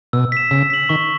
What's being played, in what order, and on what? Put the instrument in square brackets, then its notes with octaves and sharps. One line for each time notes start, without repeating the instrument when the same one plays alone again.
[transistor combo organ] B2 [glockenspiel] E6
[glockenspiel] B6 E7
[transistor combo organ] C#3 [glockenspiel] E6
[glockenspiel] B6 F#7
[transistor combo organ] D#3 [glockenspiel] C#6